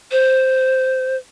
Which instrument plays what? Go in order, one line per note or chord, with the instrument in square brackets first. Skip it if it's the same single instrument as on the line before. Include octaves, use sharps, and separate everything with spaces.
[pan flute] C5